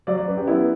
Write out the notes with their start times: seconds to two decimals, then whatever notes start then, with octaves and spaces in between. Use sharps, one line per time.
0.07 F#3 D5
0.18 D5
0.28 F#2 B4
0.37 G4
0.47 B3 E4